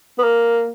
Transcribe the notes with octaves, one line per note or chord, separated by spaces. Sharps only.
B3
A#3